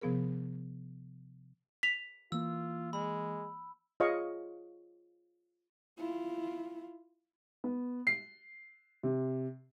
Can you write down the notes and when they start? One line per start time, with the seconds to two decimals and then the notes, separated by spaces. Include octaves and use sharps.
0.01 C3 F3 B3 G#4 A#4
1.83 B6 F7
2.32 E3 A#3 F4 E6
2.93 G#3 B5
4.00 F4 G#4 C#5 D#5 F5 C#6
5.98 E4 F4
7.64 B3
8.07 C7
9.03 C3